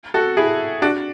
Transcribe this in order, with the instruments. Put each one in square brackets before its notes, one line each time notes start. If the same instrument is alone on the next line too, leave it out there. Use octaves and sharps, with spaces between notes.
[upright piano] F#4 A4
E4 G#4
D4 F#4